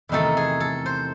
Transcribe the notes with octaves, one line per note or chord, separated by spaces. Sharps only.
E2 C3 D#3 A3 D#4 A4
G#4
A4
C5